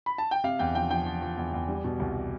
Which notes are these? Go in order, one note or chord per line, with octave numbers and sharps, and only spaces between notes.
B5
A5
G5
C3 F5
E2 G5
F3 G5
F3 G5
F3
F3
E2
E2
G3
B2
C2